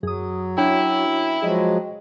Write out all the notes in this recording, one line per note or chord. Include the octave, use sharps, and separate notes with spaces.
F#2 F#3 G#4 D#6
F#2 D4 E4 F#4 C#5 G5
F3 F#3 G#3 G#4 D#5